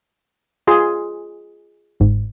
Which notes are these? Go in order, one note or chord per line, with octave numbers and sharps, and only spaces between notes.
F4 G#4 C6
G1 G#2